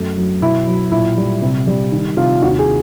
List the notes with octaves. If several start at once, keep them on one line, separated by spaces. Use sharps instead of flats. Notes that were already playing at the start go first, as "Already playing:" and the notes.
Already playing: F#2 A3
F#3
B2 E4
F#3
A#2 E4
G3
C3
G3
D#3
C3 F4
D#2 F#4
G#4